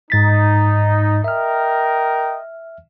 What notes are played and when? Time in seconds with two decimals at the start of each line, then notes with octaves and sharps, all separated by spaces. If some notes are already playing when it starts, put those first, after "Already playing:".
0.10 G#2 D#4 A6 B6
1.24 A#4 D#5 E5 G5 F6